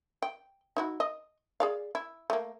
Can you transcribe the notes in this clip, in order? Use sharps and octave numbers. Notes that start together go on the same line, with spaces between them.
G5
D#4 E4 F#4
D#5
G#4 D5 F5
E4
A3 A#3